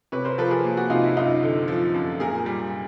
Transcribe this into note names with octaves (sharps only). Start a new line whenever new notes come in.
C3 B4 C#5
A#4 C5
F3 A4 B4
G#4 A#4
A#3
F#4 G#4
C3 D#4 F4
E4
F#2 D#4 F4
D3
F3
F#2
A#2 G#4 A#4
G3